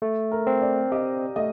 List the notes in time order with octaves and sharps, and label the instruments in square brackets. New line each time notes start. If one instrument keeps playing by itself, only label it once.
[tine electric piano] A3
[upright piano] A#4
[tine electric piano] C4
[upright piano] D5
[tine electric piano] G4 [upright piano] D#5
[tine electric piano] A3 [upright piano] D#5